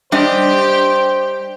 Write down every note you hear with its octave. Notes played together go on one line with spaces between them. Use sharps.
G3 D4 G4 C5 D#5 G5